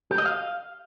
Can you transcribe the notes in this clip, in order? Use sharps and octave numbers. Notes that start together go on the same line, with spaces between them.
G4
D#5
F5